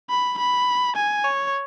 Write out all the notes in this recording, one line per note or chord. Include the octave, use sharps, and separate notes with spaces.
B5
B5
G#5
C#5